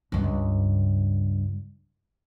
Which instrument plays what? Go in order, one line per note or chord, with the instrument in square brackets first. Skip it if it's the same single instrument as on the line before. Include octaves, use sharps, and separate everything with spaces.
[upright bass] C#2 G2